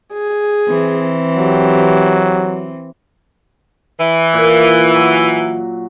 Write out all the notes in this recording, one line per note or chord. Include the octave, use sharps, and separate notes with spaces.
G#4
E3 C4
F#3 G4
E3
A#2
F#3